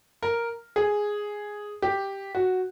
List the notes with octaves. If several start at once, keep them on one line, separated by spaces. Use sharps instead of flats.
A#4
G#4
G4
F#4